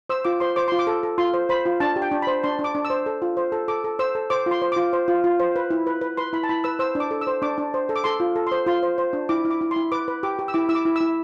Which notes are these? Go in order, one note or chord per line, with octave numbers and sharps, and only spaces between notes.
C5 E6
F4 D6
C5 C6
C5 D6
F4 C6
D6
A4
A4
F4 C6
C5
C5 B5
F4
D4 A5
G4
G5
D4
C5 B5
D4 C6
D4
D6
D4
E6
C5
A4
F4
C5
A4
A4 D6
A4
C5 E6
A4
C5 D6
F4 C6
C5
F4 D6
C5
F4
F4
C5
B4
E4
B4
B4
B4 C6
E4 B5
A5
E4 B5
B4 E6
C5 E6
D4
D6
A4
E6
C5
D4 D6
D4
C5
A4
D6
A4 C6
F4
A4
C5 C6
F4 C6
C5
C5
D4
E4 D6
E4
D6
E4
C6
E4
B4 D6
B4
G4 D6
G4
E6
E4 D6
E4 E6
D6
E4
E4 E6